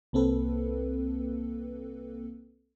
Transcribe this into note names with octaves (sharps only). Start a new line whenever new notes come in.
C2 A#3 C4 A4 B4